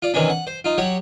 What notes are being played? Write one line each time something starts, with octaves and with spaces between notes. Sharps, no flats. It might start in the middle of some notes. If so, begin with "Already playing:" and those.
F4 D5
C3 D#3 E3 C#4 D4
F#5
C5
D#4 F4
F#3 G4 C#5 F#5